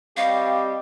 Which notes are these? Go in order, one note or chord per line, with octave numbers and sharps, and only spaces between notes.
G3 C4 G4 D#5 F5 C#6